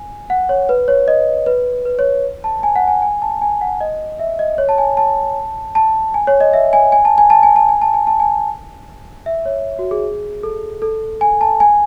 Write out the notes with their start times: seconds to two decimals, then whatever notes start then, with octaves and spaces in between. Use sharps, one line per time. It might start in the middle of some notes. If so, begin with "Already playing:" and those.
Already playing: G#5
0.30 F#5
0.49 C#5
0.69 B4
0.88 C#5
1.08 D#5
1.46 B4
1.85 B4
1.99 C#5
2.44 A5
2.63 G#5
2.76 F#5
2.88 G#5
3.02 G#5
3.22 A5
3.42 G#5
3.61 F#5
3.81 D#5
4.19 E5
4.39 D#5
4.58 C#5
4.69 A5
4.78 G#5
4.97 A5
5.75 A5
6.14 G#5
6.27 C#5
6.40 D#5
6.53 E5
6.73 G#5
6.92 G#5
7.05 A5
7.18 G#5
7.30 A5
7.43 G#5
7.56 A5
7.69 G#5
7.82 A5
7.94 G#5
8.07 A5
8.20 G#5
9.26 E5
9.46 C#5
9.79 F#4
9.91 G#4
10.43 A4
10.82 A4
11.21 G#5
11.41 A5
11.60 G#5